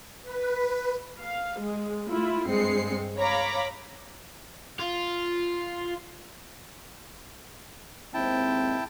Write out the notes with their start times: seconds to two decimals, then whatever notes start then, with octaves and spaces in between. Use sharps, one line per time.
0.22 B4
1.20 F5
1.59 G#3
2.08 A3 E4 F4
2.48 G2 G#3 C4 C7 C#7
3.18 C#5 F5 A#5 B5 D6
4.79 F4
8.14 D#2 G#3 C4 E4 G5 A5